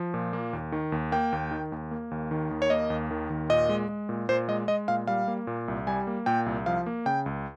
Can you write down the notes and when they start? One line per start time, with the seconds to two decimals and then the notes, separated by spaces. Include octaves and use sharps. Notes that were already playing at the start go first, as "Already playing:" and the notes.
Already playing: F3
0.14 A#2
0.33 A#3
0.53 D#2
0.72 D#3
0.92 D#2
1.12 A#3 G5
1.33 D#2
1.51 D#3
1.72 D#2
1.91 A#3
2.11 D#2
2.31 D#3
2.51 D#2
2.62 C#5
2.70 A#3 D#5
2.90 D#2
3.11 D#3
3.30 D#2
3.49 A#2 D#5
3.69 G#3
3.89 G#3
4.09 A#2
4.29 A#2 C5
4.48 G#3 D#5
4.68 G#3 D#5
4.88 A#2 F5
5.07 G3 F5
5.28 A#3
5.47 A#2
5.68 C2
5.87 G3 G#5
6.07 A#3
6.26 A#2 G5
6.46 C2
6.66 F3 F5
6.86 A#3
7.06 C#3 G5
7.26 C#2